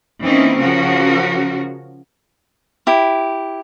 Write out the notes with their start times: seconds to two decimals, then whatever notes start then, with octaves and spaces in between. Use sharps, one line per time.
0.22 E3 A#3 C4 C#4 D#4 E4
0.59 C#3 F3 C#4 F#4 A#4
2.87 E4 G4